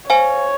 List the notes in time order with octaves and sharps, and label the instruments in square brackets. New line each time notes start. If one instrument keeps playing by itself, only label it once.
[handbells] C5 F5 G#5 [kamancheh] C#5